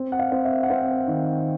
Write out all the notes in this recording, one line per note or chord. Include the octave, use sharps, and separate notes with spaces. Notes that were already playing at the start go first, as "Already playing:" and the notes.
Already playing: C4
F#5
F5
C4
E5
F#5
C4 F5
D#3